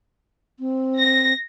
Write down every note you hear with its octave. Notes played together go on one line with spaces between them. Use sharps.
C4
A#6